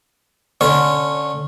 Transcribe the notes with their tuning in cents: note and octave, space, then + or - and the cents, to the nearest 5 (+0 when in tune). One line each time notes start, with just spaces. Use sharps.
D3 +0 C#4 +0 C#5 -25